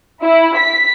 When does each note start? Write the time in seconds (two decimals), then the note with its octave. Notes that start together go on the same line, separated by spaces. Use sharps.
0.23 E4
0.57 B6